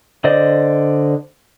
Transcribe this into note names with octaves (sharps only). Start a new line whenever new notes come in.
D3 C5 D5 D#5